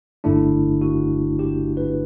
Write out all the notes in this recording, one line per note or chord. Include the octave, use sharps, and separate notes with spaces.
G1 G2 D3 A3 D4 E4
F#4
G4
B4